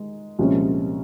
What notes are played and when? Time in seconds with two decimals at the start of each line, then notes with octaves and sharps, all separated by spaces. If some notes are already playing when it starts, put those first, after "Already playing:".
Already playing: D#3 G#3 D#4
0.39 C2 A#2 F3 G#3 C#4